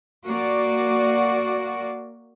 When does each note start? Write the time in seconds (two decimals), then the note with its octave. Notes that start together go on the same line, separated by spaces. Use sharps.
0.25 A#3 F#4 D5